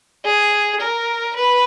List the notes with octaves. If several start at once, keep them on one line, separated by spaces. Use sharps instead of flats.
G#4
A#4
B4